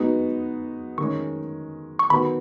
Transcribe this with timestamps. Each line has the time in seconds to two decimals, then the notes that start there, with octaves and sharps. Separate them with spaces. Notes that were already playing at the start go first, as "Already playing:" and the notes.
Already playing: G#3 B3 D#4 F#4
0.98 D#3 G#3 C#4 C#6
1.99 C#6
2.10 D#3 B3 F#4 B5